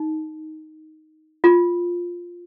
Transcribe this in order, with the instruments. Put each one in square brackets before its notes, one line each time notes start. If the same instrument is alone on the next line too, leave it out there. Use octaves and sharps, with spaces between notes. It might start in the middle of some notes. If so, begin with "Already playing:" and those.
Already playing: [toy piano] D#4
F4